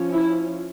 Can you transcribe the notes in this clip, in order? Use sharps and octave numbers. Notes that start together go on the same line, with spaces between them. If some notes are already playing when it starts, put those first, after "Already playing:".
Already playing: F3 C#4
E4